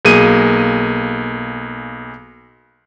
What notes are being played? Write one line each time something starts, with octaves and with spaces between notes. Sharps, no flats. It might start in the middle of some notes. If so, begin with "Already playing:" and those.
B1 A#3 G#4 D#7